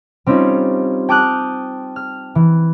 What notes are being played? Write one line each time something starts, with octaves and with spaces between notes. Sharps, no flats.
G3 C4 C#4 D#4 F4
G5 A5 D6 D#6 F6 F#6
F6
E3